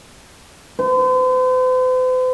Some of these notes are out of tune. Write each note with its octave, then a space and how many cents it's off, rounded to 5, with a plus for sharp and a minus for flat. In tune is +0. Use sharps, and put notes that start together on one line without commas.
C5 -45